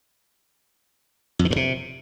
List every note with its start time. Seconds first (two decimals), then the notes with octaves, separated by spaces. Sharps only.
1.39 F2
1.45 D#3
1.51 G2
1.56 C3